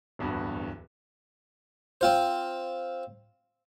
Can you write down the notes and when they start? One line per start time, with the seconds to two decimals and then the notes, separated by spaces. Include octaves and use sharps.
0.19 D1 E2 G2 F#4
2.01 C4 F4 C5